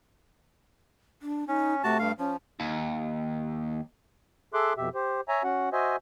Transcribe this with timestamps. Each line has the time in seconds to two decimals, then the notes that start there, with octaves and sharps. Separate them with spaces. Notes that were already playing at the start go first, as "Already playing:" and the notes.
1.22 D4
1.48 C#4 D#4
1.84 C3 A3 F#4 A5
1.99 G2 F5
2.18 F3 C#4
2.60 D#2
4.54 G#4 A4 E5 C6 D6 F#6
4.77 F2 B2 G4 E5
4.95 G4 C5
5.28 C#5 E5 G#5 A#5
5.44 C#4 F#4 F#5
5.73 F#4 C5 D#5 E5 G#5